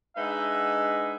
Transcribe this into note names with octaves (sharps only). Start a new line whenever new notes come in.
G#3 D4 D#4 B4 E5 F#5